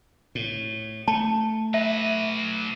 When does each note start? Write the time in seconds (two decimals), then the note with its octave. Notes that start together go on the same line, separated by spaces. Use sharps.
0.35 A2
1.08 A3 A5
1.74 F#3 B4 E5